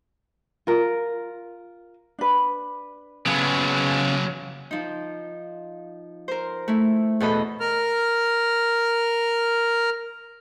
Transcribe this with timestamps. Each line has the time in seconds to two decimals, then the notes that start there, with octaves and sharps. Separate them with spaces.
0.67 F4 A#4
2.19 D4 B4
3.26 C#3 F#3 B3 G#4
4.71 F3 D#4
6.28 A#4 C5
6.68 A3 E4
7.20 E2 B2 A4 D#5 B5
7.60 A#4 F6